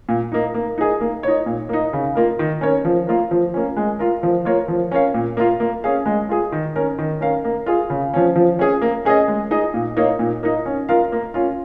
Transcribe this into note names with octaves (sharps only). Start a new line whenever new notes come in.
A#2
A#3 D#4
A#3
D#4 G#4
A#3
D#4 C#5
A#2
A#3 D#4
C#3
A#3 F4 A#4
D#3
C#4 A#4 C#5
F3
A#3 F4 A#4
F3
A#3 C#4
G#3
F4 A#4
F3
A#3 F4 A#4 C#5
F3
C#4 A#4 C#5 F5
A#2
A#3 F4
A#3
C#4 G#4 F5
G#3
F4 G#4
D#3
C#4 A#4
D#3
C#4 A#4 F5
A#3
F4 G#4
C#3
F3 C#4
F3
C#4 G#4
A#3
C#4 G#4 D#5
G#3
D#4 G#4 D#5
A#2
A#3 D#4 C#5 F5
A#2
A#3 D#4
C#4
F4 A#4 F5
A#3
C#4 F4